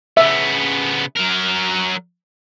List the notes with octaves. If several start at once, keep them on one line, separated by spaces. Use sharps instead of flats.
C#3 B3 E5
F#3 A#4